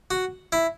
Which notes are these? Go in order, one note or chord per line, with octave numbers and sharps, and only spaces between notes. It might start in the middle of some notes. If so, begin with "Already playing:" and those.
F#4
E4